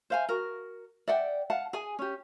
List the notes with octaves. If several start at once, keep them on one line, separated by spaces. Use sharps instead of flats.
C5 F5 G#5
F#4 A#4
D5 E5 F#5 G5
F5 F#5 A5
G#4 G#5
C#4 G4